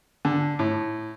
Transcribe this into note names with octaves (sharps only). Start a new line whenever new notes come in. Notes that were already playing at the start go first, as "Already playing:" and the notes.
D3
A2